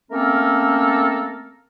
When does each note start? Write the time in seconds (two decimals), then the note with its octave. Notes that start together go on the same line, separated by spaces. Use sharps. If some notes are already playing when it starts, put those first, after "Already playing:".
0.12 A3 A#3 C4 C#4 A4 A#4